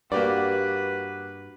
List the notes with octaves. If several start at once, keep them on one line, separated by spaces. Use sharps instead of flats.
G2 A#3 F#4 G4 B4 D5